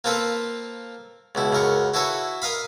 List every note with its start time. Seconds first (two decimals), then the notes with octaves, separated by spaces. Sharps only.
0.04 A#3 C4 F4 A4 B4
1.35 C#2 B2 E4
1.53 C#2 F#2 A#4 C#6
1.94 E4 F#4 A4 B4 C#5 E5
2.42 A#4 D#5 F5 B5